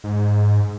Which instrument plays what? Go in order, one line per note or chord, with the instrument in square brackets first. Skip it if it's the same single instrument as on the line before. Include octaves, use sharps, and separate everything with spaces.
[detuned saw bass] G#2